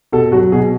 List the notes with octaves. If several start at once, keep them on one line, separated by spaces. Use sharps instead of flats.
B2 A4
F#3 F#4
B2 G#4